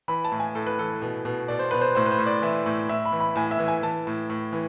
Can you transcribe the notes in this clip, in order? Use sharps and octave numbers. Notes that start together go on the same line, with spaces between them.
E3 B5
A5
A2
G#5
A2 A4
B4
E3 A4
B2
B2
B2 D5
C5
B2 B4
C5
A2 C5
B4
C5
A2
D5
E3 E5
A2
A2 E5
B5
E3
B5
A2 G#5
E5
E3
G#5
E3 A5
A2
A2
E3